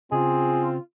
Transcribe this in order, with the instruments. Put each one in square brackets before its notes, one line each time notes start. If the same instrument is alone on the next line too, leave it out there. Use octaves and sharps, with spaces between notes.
[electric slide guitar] C#3 [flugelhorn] C4 [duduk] F4 [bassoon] G#4